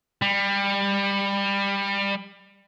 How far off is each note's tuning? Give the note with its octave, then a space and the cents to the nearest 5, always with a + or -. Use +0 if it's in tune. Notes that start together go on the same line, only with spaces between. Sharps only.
G3 +20